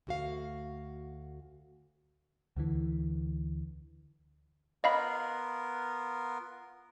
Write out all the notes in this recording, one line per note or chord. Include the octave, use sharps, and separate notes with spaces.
D2 F#4 F5
D2 D3 E3
B3 F4 A#4 D#5 F5 B5